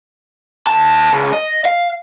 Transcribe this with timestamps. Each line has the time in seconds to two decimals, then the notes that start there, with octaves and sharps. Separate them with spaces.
0.67 D#2 A5
1.13 C#2
1.33 D#5
1.66 F5